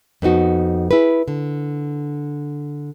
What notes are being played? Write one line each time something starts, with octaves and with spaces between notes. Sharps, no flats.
F2 B3 D#4 F#4
E4 G#4 B4
D3